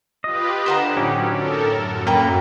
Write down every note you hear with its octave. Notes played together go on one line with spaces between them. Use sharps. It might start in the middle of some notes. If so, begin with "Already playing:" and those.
F4 G4 B4 D#5
D3 C5 F#5 A#5
A2 F#3 C#4 D#4 G4
A4 A#4
F#2
A#3 B4 G5 A#5